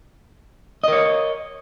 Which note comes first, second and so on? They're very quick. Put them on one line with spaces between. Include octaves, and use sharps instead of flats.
D#5 A#4 C#5